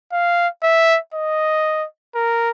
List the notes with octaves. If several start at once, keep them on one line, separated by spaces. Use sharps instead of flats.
F5
E5
D#5
A#4